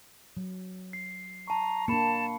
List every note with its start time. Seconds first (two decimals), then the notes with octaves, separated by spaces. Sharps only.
0.37 F#3
0.93 C7
1.48 A5 A#5 C#6
1.88 A#3 D4 A5 B5 C#7